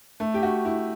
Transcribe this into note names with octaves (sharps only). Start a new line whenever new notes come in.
A3
G4
F#4
E4